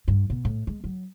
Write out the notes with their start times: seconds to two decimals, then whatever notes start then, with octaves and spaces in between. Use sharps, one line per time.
0.08 G2
0.30 B2
0.45 A2
0.67 G#3
0.84 F#3